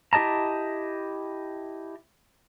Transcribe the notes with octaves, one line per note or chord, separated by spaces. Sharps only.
E4 G4 D#5 A5 A#5